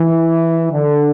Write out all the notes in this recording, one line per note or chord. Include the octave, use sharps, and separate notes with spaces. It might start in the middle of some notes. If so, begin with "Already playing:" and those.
Already playing: E3
D3